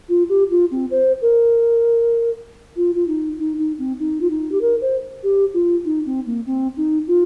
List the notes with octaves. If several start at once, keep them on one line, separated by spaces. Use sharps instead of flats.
F4
G4
F4
C4
C5
A#4
F4
F4
D#4
D#4
D#4
C4
D#4
F4
D#4
G4
A#4
C5
G4
F4
D#4
C4
A#3
C4
D#4
F4